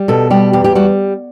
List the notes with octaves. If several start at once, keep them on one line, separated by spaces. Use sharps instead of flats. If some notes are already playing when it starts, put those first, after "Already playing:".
Already playing: G3
B2 A4
G3 G4
E2 G4
G4
G3 F#4